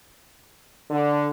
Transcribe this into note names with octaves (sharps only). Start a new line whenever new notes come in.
D3